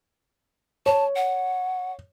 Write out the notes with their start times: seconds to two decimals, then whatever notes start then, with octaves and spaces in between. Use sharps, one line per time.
0.86 C#5 A5
1.16 F#5